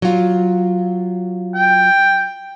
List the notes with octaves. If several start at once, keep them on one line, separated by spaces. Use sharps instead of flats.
F#3 F4
G5